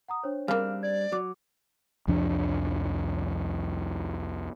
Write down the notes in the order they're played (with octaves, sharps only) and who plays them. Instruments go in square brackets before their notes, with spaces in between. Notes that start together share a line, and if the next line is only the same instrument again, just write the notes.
[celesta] F#5 A#5 D#6
D4 C5 C#5
[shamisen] C#3 A#3 [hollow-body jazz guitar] G3 C4 D4 [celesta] F5 F6
[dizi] D5 [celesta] G#6
[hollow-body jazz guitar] F#3 [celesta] F#4 D6
[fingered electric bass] C2 F2 F3 D4